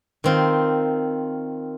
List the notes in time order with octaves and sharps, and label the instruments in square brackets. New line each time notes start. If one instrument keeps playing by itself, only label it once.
[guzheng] D#3 C4 F4